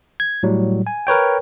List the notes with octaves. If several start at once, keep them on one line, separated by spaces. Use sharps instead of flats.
G#6
A2 F#3 G3
G#5
A#4 B4 C#5 G5